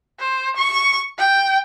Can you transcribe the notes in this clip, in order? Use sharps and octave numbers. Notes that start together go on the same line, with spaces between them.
C5
C#6
G5